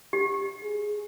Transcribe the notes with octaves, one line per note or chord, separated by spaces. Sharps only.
G4
G#4